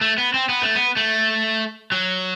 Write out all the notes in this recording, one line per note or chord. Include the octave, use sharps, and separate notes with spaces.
A3
B3
C4
B3
A3
B3
A3
F#3